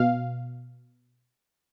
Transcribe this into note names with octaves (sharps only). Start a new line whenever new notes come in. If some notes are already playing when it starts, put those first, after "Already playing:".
Already playing: B2 F5